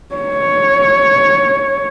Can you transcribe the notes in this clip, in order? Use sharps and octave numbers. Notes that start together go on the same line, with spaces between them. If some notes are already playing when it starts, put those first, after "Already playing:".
C#5